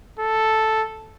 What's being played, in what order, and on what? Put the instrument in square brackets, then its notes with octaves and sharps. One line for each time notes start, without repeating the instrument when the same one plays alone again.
[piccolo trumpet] A4